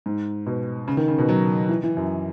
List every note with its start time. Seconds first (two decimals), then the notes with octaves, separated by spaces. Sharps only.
0.06 G#2
0.47 B2
0.88 C#3
0.97 D#3
1.08 C#3
1.19 B2
1.29 F#3
1.69 E3
1.83 E3
1.97 F#2